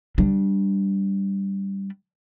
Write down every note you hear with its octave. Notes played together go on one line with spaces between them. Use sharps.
G3 D4